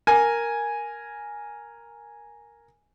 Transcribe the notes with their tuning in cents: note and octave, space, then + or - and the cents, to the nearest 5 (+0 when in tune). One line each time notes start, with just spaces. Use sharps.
A#4 +0 G#5 +0